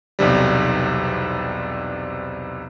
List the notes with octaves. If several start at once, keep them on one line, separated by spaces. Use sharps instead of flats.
B1 E2 C3 G3